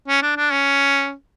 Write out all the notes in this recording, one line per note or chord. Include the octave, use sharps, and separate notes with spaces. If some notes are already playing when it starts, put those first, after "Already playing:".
C#4
D4
D4
C#4